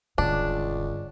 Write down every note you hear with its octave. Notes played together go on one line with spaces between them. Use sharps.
E1 C#2 G2 D3 D4